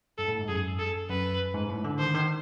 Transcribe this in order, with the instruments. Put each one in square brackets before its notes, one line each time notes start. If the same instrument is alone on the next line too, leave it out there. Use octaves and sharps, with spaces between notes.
[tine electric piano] G2 [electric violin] A4
[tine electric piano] A2
G#2
[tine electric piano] F#2 [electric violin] G#4
[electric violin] A4
[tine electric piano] F#2 [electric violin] B4
[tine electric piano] G#2
A2
D3
[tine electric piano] D#3 [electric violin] C5
[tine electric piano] D#3